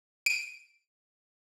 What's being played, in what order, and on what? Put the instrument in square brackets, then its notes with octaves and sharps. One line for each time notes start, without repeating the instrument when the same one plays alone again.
[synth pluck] D7 D#7